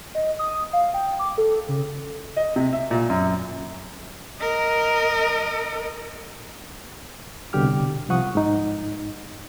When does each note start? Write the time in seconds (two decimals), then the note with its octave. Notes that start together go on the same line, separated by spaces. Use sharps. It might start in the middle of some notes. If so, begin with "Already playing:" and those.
0.15 D#5
0.39 D#6
0.73 F5
0.94 G5
1.19 D6
1.38 A4
1.69 C#3
2.37 D#5
2.56 C3
2.73 E5
2.91 A#2
3.10 F#2
4.40 A#4 D#5
7.53 C2 B2 D3 G4 D6 F6
8.10 C2 F3 F#5 C#6 D#6
8.35 G#2 D#4